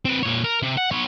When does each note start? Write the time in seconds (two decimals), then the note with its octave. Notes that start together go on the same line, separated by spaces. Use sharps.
0.05 C4 B4
0.23 A#2 C#5
0.44 A#4
0.62 C3
0.77 F#5
0.91 B3 C#5